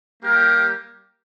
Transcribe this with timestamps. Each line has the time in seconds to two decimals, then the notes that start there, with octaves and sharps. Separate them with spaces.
0.22 G3 A#3 G4 A#4